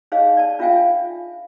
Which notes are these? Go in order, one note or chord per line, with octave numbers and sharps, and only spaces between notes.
D#4 G#4 C#5 D#5 F5
D5 A5
D4 F4 E5 F5 G5 G#5